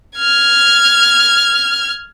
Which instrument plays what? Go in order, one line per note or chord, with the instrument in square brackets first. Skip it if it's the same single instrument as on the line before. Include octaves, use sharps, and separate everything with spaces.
[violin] F6 G#6